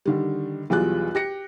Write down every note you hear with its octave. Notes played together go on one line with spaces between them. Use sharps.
D3 D#3 G3
B1 E2 G3 F4 G#4 F#6
G4 A#6 C#7